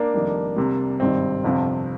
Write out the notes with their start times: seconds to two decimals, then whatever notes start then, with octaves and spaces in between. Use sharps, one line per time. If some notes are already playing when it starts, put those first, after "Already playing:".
Already playing: A#3 D4
0.14 F1 F2 D#3 G3
0.56 C2 C3 G3
1.00 G#1 G2 D#3 G3 C4
1.44 G1 F2 C3 F3